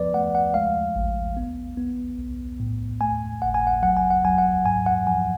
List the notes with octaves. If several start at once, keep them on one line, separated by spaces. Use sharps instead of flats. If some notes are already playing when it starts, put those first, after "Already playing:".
Already playing: F3 B3 B4 D5
A3 F#5
F#5
G#3 F5
A1
B3
B3
B1
A2
A3 G#5
G#1 F#5
G#5
F#5
F#3 F#5
G#5
F#5
F#3 G#5
F#5
G#2 G#5
F#5
F3 G#5